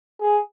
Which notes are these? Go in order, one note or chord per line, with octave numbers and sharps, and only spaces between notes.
G#4